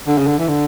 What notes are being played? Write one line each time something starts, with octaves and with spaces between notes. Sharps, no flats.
D3
C#3
D3
E3
D3